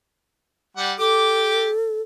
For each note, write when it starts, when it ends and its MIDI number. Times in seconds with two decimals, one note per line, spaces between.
0.77 0.92 55
0.77 0.92 78
0.99 1.68 67
0.99 2.02 69
0.99 1.68 86